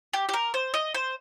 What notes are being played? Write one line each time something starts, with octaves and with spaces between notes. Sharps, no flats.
G4
G4
A#4
C5
D#5
C5